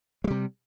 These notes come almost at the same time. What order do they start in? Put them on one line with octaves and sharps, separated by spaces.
G#3 G3 C3